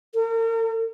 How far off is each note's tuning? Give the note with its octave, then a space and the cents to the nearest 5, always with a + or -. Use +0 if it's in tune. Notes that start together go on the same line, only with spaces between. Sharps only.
A#4 -40